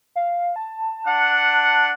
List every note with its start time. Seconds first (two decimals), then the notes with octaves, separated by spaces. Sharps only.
0.16 F5
0.56 A5
1.07 D4 F#5